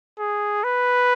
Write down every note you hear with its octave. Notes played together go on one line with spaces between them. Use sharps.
G#4
B4